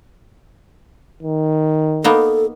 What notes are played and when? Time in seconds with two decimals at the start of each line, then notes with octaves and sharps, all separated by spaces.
1.22 D#3
2.04 A#3 B3 D#4 A4